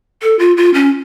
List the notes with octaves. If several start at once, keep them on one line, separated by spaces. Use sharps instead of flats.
A4
F4
F4
C#4